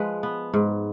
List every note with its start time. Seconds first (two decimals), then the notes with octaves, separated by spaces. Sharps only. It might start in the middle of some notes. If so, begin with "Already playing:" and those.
Already playing: F3 G#3 B4
0.23 B3
0.54 G#2